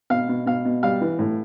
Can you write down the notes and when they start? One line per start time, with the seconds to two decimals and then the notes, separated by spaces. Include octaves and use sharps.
0.10 B2 F5
0.29 B2
0.46 B2 F5
0.65 B2
0.83 G3 F5
1.01 E3
1.19 A2